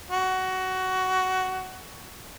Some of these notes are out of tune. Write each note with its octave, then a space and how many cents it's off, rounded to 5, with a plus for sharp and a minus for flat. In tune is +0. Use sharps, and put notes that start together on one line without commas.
F#4 +15